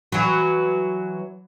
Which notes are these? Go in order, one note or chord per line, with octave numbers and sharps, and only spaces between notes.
E3 F#3